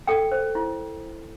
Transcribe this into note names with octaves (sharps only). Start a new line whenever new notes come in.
A4 G5
C5
E4